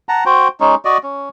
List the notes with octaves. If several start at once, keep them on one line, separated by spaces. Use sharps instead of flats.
F#5 A5 A#5
F#4 C5 G5
G#3 C#4 D#4
F#4 D5 D#5
C#4